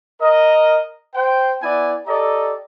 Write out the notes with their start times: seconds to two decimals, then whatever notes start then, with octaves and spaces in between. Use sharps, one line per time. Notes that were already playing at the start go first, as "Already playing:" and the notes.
0.22 A#4 D#5
1.15 C5 G5
1.63 B3 E4 D5 G#5
2.07 G4 A4 D5 D#5 A#5